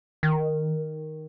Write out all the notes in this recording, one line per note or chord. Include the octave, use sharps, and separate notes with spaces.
D#3